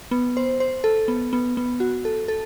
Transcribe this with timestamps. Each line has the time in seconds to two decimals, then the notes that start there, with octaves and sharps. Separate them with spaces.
0.11 B3
0.37 C5
0.60 C5
0.84 A4
1.08 B3
1.33 B3
1.57 B3
1.80 F#4
2.05 A4
2.28 A4